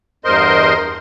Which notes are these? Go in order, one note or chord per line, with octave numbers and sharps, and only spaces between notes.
E2 G2 A#4 C5 D#5 C6